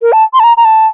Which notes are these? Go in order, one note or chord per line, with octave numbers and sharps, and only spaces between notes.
A#4
A5
C6
A5
A#5
A#5
A5